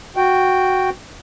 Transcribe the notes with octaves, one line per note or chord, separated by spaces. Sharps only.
F#4 G5